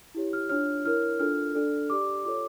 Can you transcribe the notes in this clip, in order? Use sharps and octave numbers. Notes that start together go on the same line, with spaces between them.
E4 G4 C#5
F6
D4 F4 C#5 F6
E4 A#4 C#5 F6
D4 F4 A4 F6
D4 A4 D5
G4 D5 D6
F4 A4 C#5 D6